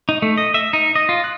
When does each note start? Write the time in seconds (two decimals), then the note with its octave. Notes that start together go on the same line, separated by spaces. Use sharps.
0.09 D#4
0.22 A3
0.37 D#5
0.54 E5
0.73 D#4
0.95 D#5
1.09 F4
1.24 F#6